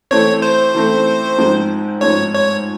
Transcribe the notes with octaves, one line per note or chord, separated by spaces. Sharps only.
E3 A3 C4 C#5
C5
E3 A3 C4
G#2 F3 G#3 C4 D#4
G#2 F3 G#3 C4 D#4 C#5
C#5